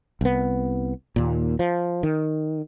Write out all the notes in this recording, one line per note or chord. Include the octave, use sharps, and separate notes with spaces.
C2 B3
D#2 A#2
F3
D#3